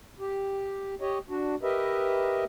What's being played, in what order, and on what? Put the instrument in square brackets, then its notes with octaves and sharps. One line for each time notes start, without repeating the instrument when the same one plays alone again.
[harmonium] G4
G4 C#5 D#5
D4 F#4
G4 A#4 B4 D#5 E5